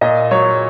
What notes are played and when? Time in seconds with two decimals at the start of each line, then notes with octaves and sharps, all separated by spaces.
0.01 A#2 D#5
0.31 F#3 C#5